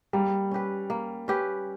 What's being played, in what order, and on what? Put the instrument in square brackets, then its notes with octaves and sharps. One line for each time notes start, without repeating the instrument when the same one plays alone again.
[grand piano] G3 [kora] A#3
[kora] C#4 G4 B4
A#3
C#4 G4 B4